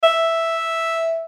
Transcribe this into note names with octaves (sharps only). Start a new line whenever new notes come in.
E5